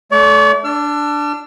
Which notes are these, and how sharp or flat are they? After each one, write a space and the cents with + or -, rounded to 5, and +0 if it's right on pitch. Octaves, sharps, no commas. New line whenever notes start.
A3 -20 D5 -40 C#6 +15
D4 +0 E6 +40